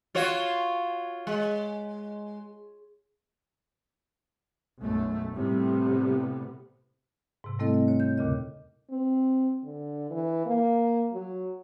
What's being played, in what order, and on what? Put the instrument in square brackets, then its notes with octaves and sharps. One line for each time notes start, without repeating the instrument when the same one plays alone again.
[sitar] F4 F#4 C#5
G#3
[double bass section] B1 F#2 A3
A2 C3 G3 B3
[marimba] G#2 C3
G3 A3 C4 E4 A4 D#5
D#5
C#5
G6
D#2 A#2 C#3 D#5
[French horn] C4
D3
E3
A#3
F#3